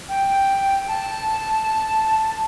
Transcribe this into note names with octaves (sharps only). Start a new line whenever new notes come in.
G5
A5